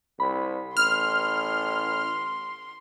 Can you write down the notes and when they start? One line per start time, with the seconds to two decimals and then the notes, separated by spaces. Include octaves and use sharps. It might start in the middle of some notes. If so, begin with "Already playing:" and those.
0.20 C2 B5
0.77 A1 C6 F6